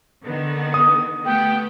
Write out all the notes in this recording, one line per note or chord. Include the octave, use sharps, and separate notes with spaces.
D3 D#3 B3
D#6
A3 B3 G4 G5